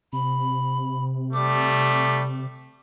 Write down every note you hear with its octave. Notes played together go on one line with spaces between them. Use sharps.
C3 B5
G3 A3 D6